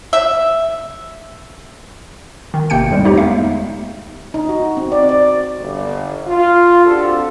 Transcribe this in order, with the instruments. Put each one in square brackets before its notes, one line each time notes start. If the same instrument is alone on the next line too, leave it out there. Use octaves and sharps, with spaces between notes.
[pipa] E5
[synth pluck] D#3
G#1 C3 A#3 G5 G6 C#7
F2 G#2 G3 G#3 B3
A3 D#4 G4 C#5
G#3 B3 E5 F5
[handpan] D#4
F#4
C4
D5
D5
[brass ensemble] G1
F4
C4 D4 F#4 G4 A4